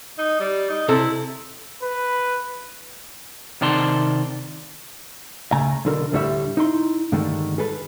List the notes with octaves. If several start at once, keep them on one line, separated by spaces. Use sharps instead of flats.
D#4
G3
D#4
C3 E4 A4
B4
C3 D#3 D5 A5 C6
C#2 C#3 A3 G#5 A#5
B1 D3 A#4
D2 A2 D3 G3 C#5 E5
D#4 E4 C6
G2 D3 D#3 G#3 A3
G#4 A4 B4